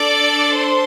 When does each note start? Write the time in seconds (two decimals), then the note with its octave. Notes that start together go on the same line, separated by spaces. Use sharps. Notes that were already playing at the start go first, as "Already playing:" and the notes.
Already playing: D4 A4 D5 D6
0.56 C5 C6